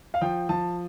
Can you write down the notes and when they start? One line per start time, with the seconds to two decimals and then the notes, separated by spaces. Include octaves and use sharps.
0.14 F5
0.21 F3 G5
0.49 F3 A5